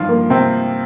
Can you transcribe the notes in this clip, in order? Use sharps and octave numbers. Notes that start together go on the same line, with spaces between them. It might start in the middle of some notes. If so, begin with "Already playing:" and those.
Already playing: G2 D#3 F3 F4
A#3
C3 C4